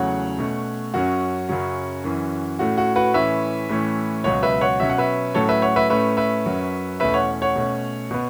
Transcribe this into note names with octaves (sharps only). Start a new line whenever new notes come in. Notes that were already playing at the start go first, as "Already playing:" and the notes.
Already playing: E2 C#3 F#3 A3 C#5 F#5
B2 A3 C#4
F#2 F#3 C#4 F#4
F#2 C#3 F#3 C#4
F#2 E3 C#4
A2 A3 C#4 F#4
F#4
F#4 B4
A2 E3 C#4 B4 E5
A2 E3 A3 C#4
C#2 B2 F#3 C#5 F#5
B4 E5
C#5 F#5
B2 F#3 C#4 E5
F#5
B4 E5
A2 F#3 A3 C#4 A4 C#5
B4 E5
C#5 F#5
B4 E5
A2 A3 C#4 B4 E5
B4 E5
F#2 F#3 C#4
E2 B2 A3 C#4 B4 E5
C#5 F#5
C#5 F#5
B2 A3 C#4
B2 B3